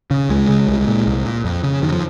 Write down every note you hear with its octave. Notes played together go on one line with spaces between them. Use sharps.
C#3
C#2 G#3
C#3
C2
A#2
C2
A#2
F2
C#3
F2 D#3
F3